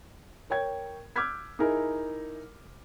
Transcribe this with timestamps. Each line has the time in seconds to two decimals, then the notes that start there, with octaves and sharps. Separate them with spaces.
0.50 A#4 C#5 G5 G#6
1.16 D6 E6 F6 G6 G#6 B6
1.59 D#4 E4 G#4 A#4